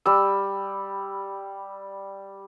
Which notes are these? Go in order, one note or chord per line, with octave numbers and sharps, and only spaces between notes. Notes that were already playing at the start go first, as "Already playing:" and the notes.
G3 E6